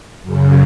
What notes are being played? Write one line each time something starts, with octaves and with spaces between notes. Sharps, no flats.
F#2 C#3